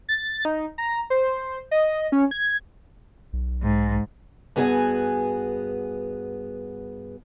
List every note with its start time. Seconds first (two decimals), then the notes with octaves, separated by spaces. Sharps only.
0.09 A6
0.45 D#4
0.78 A#5
1.10 C5
1.71 D#5
2.12 C#4
2.31 G#6
3.33 B1
3.62 G#2
4.56 G2 B3 F#4 G#4 B4 G#5